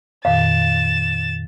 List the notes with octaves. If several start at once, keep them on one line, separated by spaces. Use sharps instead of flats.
F2 A#2 D#3 F5 A6 E7